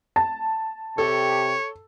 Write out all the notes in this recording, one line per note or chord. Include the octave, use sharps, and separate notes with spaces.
A5
C3 G4 A4 C#5